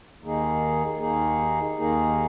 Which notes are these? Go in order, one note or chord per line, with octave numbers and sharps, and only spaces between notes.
D#2 D#3 A#3 D#4 G#4
D#2 D#3 A#3 D#4 G#4
D#2 D#3 A#3 D#4 G#4